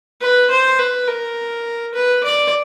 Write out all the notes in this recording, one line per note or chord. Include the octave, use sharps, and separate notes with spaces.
B4
C5
B4
A#4
B4
D5